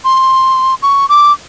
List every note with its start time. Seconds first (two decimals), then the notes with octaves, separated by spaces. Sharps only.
0.05 C6
0.82 C#6
1.09 D6